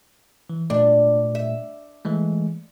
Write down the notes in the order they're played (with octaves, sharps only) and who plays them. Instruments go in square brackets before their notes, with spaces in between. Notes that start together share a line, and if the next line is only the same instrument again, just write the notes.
[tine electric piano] E3
[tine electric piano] A#2 A3 [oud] D4
[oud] E5
[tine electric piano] E3 G#3 A3